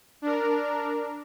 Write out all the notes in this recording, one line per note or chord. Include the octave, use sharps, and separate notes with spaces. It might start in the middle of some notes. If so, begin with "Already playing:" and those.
D4 A#4